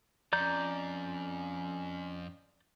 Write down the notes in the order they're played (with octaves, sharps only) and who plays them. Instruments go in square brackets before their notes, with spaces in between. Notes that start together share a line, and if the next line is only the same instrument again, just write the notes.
[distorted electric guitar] F2 [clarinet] C#4 [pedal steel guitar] D5 A#5 G6